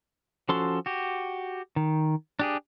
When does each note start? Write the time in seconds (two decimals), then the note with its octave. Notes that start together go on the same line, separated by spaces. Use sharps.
0.49 F3 C#4 F#4 A4 C6
0.86 F#4 G4
1.76 D#3
2.39 D4 G4 G#4